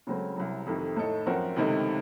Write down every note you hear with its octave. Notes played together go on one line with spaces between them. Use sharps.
C#2 C#3 F#3 A3 C4
C2 C3 F#3
F2 C3 D#3 A3
A2 A3 D#4 A4
F#2 F3 C4 F#4 A#4
C#2 C3 D#3 A3 D#4